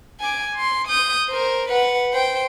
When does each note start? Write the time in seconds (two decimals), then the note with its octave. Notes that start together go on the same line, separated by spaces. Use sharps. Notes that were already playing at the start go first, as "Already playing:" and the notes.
0.20 G#5 D6
0.56 C6
0.88 D#6 G6
1.29 A#4 C5
1.69 B4 F#5
2.13 C5 G5